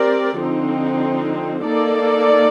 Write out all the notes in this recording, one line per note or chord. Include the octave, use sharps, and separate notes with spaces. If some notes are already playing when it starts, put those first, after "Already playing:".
Already playing: C4 G4 A#4 D5
D3 F3 C4 D#4
A#3 D#4 A4 D5